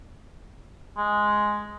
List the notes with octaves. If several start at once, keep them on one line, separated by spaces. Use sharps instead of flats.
G#3